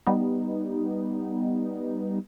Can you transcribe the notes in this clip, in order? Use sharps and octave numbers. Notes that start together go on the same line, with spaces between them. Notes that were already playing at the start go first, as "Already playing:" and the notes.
G3 B3 D#4